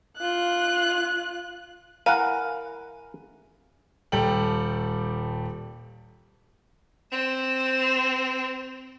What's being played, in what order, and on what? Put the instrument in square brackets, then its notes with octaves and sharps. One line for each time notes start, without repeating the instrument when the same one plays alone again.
[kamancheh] F4 F#6
[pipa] E3 F5 [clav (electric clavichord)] A#4 F#5 [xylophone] G#5
[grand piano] D#1 G3 A4 G5 F#7
[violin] C4 E7